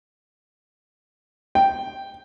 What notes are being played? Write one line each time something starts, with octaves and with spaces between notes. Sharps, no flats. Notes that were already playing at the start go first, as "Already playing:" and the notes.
G5